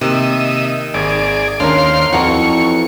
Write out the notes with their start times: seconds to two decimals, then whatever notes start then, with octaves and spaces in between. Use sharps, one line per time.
0.01 C3 D#3 A#3 D#5 E5
0.94 G#1 G#4 D5
1.60 D#2 C#4 D4 A#4 C5 F5 C6
2.13 F2 E3 F#4 F#5 A#5 C#6